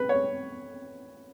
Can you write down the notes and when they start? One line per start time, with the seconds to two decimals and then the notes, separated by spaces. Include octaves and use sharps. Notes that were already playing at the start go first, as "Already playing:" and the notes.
Already playing: B4
0.09 C#5